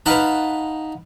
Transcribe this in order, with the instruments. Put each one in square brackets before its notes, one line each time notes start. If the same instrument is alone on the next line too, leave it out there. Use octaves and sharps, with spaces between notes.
[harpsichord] D#4 A5 B5 [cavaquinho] B4 F5 F#5